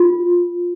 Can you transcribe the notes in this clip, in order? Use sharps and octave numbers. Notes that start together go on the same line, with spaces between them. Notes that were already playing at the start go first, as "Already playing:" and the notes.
Already playing: F4